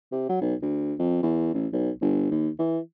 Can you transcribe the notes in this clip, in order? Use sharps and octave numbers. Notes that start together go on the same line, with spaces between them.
C3
F#3
B1
D2
F2
E2
A1
B1
G1
D#2
E3